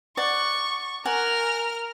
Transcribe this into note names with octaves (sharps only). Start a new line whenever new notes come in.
D5 F#5 C#6
A#4 F#5 G#5 F6